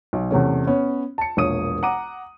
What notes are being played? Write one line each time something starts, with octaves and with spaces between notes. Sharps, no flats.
B1
E2 C3 A3 C#4
B3 C#4
A5 C#7
E1 A#1 A#3 C#5 D#6 D#7
F#5 A#5 D6 D#7